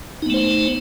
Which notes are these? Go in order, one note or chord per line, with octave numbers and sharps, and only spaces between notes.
A3 B3 D#4 C5